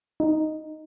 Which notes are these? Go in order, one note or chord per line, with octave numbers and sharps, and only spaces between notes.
D#4